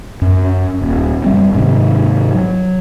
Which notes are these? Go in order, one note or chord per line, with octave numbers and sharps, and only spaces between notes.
F#2
D#1
F#1 G3 C4
G#2 C3 D#3
F#3